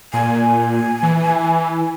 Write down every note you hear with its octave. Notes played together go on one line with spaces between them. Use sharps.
A#2 G#5
E3